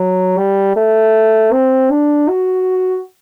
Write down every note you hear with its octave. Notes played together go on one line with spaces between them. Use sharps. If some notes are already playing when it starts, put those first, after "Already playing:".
Already playing: F#3
G3
A3
C4
D4
F#4